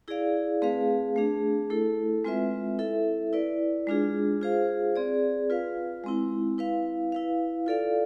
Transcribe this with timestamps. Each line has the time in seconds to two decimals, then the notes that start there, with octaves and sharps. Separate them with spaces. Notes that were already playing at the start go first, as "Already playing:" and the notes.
0.08 E4 G#4 D5 F5
0.62 A3 C4 G#4 B4 F5
1.16 A3 D4 G#4
1.70 A3 E4 A4
2.24 G#3 C4 F4 B4 E5
2.79 E4 A4 E5
3.33 E4 B4 D5
3.87 G#3 D4 F4 G#4
4.41 F4 G#4 C5 F5
4.96 C4 G#4 D5
5.50 F4 B4 F5
6.04 G#3 C4 E4
6.58 E4 B4 F5
7.12 E4 B4 F5
7.66 F4 A4 D5 F5